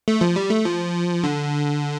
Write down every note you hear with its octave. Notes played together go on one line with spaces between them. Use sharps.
A3
F3
G3
A3
F3
D3